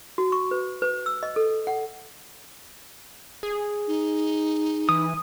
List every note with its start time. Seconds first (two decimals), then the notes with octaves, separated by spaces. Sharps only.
0.18 F#4
0.32 C#6
0.51 B4
0.82 B4
1.06 E6
1.23 D#5
1.36 A4
1.67 F#5
3.43 G#4
3.88 D#4
4.89 E3 D#6